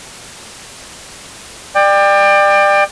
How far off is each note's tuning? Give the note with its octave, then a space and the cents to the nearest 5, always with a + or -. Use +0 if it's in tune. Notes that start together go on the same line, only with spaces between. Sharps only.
D5 +25 G5 +20